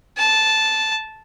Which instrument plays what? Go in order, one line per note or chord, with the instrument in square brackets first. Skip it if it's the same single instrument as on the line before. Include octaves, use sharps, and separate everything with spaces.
[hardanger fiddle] A5